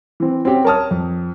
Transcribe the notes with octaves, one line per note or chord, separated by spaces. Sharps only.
E3 C4
C4 C#4 F#4 G4
A#4 C#5 A5 D#6 F6
F2